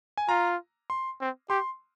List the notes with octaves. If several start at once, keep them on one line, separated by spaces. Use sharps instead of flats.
G#5
F4 A#5
C6
C4
G4 C6